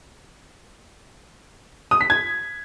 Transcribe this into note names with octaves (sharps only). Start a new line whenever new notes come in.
D#6
B6
G#6